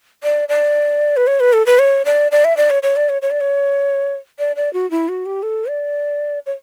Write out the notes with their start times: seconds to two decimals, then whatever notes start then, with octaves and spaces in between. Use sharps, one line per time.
0.23 D5
0.49 D5
1.17 B4
1.27 C#5
1.40 B4
1.53 A4
1.66 B4
1.79 C#5
2.05 D5
2.32 D5
2.45 E5
2.57 D5
2.70 C#5
2.83 C#5
2.96 D5
3.09 C#5
3.22 C#5
3.31 D5
3.41 C#5
4.39 D5
4.56 D5
4.73 F#4
4.91 E4
5.09 F#4
5.26 G4
5.43 A4
5.69 D5
6.46 C#5